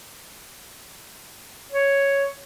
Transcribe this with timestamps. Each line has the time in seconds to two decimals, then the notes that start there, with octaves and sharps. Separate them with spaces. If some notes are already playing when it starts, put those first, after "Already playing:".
1.72 C#5